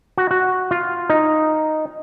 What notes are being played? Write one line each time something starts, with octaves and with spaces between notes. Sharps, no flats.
F#4
F#4
F4
D#4